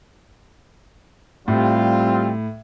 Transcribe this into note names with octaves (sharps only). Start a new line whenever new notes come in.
A2 G3 C4 F4